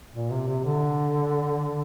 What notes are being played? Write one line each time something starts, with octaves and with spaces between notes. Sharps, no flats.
A#2
C3
C3
D3